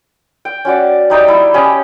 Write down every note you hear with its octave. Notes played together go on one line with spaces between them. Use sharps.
G5
C#4 F#4 D5
G3 D#4 D5 G5
E4 G5
C#4 G4 D#5